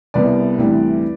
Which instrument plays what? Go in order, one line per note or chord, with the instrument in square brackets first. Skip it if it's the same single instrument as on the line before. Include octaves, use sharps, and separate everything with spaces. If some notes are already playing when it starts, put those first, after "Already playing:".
[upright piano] C2 C3 G3 B3 B4 D5
D2 C3 E3 G3